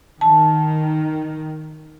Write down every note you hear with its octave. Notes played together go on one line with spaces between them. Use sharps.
D#3 A5